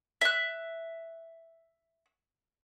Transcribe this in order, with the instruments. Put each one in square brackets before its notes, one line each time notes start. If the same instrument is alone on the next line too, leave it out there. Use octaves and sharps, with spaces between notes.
[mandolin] E5 F#6